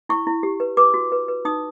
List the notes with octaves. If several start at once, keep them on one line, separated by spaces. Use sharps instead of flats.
E4 C#6
E4
G4
B4
B4 D6
F#4
B4
B4
D#4 D#6